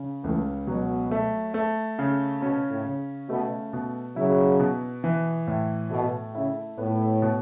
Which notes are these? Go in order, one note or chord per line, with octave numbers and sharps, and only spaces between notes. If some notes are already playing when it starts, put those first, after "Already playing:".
Already playing: C#3
C#2 E3 A3
B2 F#3
A3
A3
C#3
B2 C#4
A2
C#3
B2 A3
B2
C#3 F#3 E4
B2
E3
A2
B2 A3
C#3 E4
A2 B3
B2